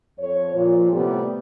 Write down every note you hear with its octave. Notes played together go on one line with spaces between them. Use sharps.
F2 C#5
A#2 F3
A2 C3 G3 A3 B3 C4